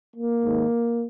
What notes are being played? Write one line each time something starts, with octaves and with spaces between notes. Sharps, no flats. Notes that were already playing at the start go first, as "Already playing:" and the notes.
A#3
G#2 D#3